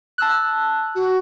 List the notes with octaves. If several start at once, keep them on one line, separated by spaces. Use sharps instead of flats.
A5 E6 F#6
F#4